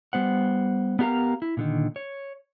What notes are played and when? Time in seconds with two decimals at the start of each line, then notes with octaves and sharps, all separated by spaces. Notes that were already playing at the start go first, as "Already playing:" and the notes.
0.13 G3 B3 C5 F#5
0.99 B3 D4 G4 A#4 F5 A#5
1.42 E4
1.57 A#2 D3 D#3
1.96 C#5